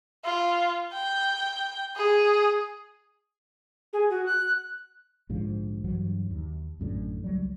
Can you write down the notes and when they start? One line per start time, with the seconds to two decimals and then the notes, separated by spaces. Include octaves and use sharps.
0.25 F4
0.93 G5
1.96 G#4
3.93 G#4
4.10 F#4
4.26 F#6
5.29 A#1 G#2 D3 F3
5.84 G2 E3 F#3
6.30 D#2
6.79 A1 F#2 A2 D3
7.24 C#2 F#3 G3